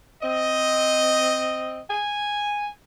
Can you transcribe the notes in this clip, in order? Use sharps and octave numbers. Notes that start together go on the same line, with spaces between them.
C4 D#5
G#5